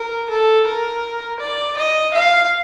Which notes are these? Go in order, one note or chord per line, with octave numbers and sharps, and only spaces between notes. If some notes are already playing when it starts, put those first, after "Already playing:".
Already playing: A#4
A4
A#4
D5
D#5
F5